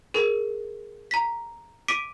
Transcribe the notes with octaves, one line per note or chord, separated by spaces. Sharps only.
G#4 A#4
A#5 B6
D6 B6 D7 D#7